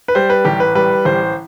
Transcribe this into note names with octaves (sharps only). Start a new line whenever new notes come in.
B4
G3 C5
B4
A1 G4
B4
G3 B4
A1 C5